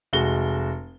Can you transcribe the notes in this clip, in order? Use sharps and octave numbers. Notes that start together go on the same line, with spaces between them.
F1 G#3 F#4 G7